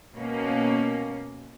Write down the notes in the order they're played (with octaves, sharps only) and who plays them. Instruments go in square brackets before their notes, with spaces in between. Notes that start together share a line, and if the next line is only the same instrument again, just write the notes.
[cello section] B2 A#3 C#4